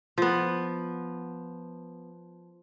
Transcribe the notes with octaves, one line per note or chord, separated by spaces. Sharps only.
F3 B3